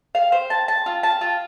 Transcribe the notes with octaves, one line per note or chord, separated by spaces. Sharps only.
F5
C5
A5
A5
F4
A5
F4